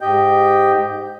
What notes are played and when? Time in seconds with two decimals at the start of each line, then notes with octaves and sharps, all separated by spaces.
0.01 G#2 G4 D#5 G5 G6